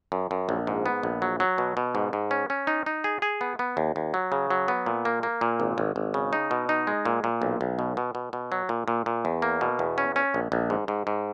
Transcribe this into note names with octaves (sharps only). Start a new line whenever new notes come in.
F#2
F#2
A#1
G#2
B3
A#1
F#3
F#3
B2
B2
G#2
G#2
C#4
C#4
D#4
D#4
G#4
G#4
B3
B3
D#2
D#2
F#3
C#3
F#3
B3
A#2
A#3
A#3
A#2
G#1
G#1
G#1
C#3
D#4
B2
D#4
G#3
A#2
A#2
B1
B1
B2
B2
B2
B2
F#3
A#2
A#2
A#2
E2
A#3
B2
E2
C#4
C#4
A#1
A#1
G#2
G#2
G#2